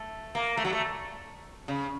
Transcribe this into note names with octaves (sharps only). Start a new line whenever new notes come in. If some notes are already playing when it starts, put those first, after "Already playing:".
Already playing: A3
A#3
A3
F#3
A3
C#3